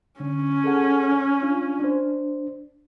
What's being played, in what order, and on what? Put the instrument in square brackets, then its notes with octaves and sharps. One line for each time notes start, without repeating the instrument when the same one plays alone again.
[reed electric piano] D3 [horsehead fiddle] C#4
[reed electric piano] G#4 A4 F#5
D4 F4
D4 C5